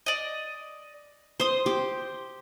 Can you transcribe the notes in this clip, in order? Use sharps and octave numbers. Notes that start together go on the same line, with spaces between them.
D5 D#5
C5 C6 D#6
G4